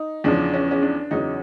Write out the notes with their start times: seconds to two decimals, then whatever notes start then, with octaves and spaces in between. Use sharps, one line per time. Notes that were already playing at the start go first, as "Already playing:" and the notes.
Already playing: D#4
0.24 E2 C#3 F3 D4
0.53 C#4
0.71 C#4
0.82 D4
1.11 E2 C#3 F#3 D#4